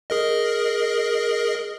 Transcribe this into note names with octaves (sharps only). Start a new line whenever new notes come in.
G#4 A#4 D#5